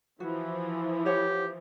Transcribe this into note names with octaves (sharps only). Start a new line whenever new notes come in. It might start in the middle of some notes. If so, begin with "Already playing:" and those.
E3 F3 E4 F#4
G4 C5 C#5 F#5